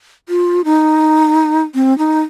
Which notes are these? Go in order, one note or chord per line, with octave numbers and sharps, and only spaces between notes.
F4
D#4
C4
D#4